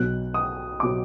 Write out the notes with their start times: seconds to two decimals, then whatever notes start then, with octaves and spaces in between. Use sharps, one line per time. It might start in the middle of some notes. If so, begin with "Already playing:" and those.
Already playing: B1 B2 F#3 F#6
0.34 D#6
0.80 B2 F#3 D6